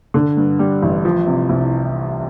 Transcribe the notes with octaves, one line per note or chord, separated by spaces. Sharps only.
D3
G2
G3
A1
F3
C3
C2